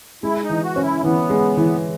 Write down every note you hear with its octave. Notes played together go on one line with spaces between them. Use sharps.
G#3 E4
D#4
E3
F#4
C#4
E4
E3 B3
G#3
E3